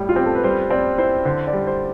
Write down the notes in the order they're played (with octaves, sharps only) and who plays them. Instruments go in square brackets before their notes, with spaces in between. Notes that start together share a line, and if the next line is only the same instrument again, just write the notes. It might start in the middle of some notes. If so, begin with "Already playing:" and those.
Already playing: [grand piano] A2 G3
[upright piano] F4
[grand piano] C4 [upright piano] G4
[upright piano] A4
B4
[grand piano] G3 [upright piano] C5
[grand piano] C4 [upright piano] D5
[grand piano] E4 [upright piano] C5
[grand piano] D3 [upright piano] C5
[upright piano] D5
[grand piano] G3
[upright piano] C5